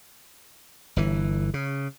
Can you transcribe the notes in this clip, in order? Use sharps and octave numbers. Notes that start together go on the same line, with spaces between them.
G1 E3
C#3